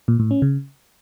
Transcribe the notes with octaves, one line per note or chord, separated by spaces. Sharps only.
A#2
A2
C#4
C#3